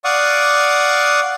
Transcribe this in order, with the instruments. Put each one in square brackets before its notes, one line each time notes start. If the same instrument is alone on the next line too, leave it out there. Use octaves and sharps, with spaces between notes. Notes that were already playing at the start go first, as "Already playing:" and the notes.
[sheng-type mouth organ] D5 F5 F#5 C#6 D#6